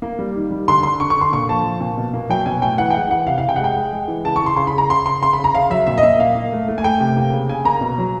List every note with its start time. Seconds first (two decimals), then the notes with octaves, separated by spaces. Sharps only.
0.02 A#3
0.19 G3
0.36 D#3
0.51 G3
0.68 D3 C6
0.83 D3 C6
1.00 D3 C#6
1.10 C#6
1.16 D3 C6
1.33 A#2 C#6
1.49 F3 A5
1.64 F3
1.81 A#2
1.97 B2
2.14 A#3
2.29 F#3 G5
2.46 B2 G#5
2.62 A2 G5
2.78 E3 F#5
2.90 G5
2.94 G#3 F#5
3.11 E3 F#5
3.27 C3 F5
3.38 F5
3.43 C3
3.49 G5
3.56 F#5
3.59 G#3 G5
3.77 G#3
3.93 G#3
4.08 E3
4.25 C#3 A5
4.36 C#6
4.41 C#3
4.46 C6
4.56 C#3 C6
4.67 B5
4.74 C#3 A#5
4.90 C#3 C6
5.06 C#3 C6
5.22 C#3 C6
5.33 B5
5.39 C#3
5.44 A#5
5.54 C#3 F5
5.70 F#3 E5
5.87 A#2 E5
5.98 D#5
6.03 A#2 E5
6.19 A#3 F5
6.35 A#3
6.52 A3
6.68 A3
6.78 G#5
6.84 A3 G5
7.00 C3
7.17 A#3
7.33 C#3
7.49 C#3 G#5
7.65 A#3 A#5
7.81 B2
7.98 F#3